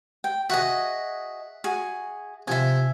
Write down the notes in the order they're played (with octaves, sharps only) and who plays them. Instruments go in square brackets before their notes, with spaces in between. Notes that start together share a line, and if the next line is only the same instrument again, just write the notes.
[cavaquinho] G5
[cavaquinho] F#4 G#4 D#5 [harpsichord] E5 F#5
[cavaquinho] F#4 G#4
[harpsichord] C3 F3 [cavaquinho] E5 G#5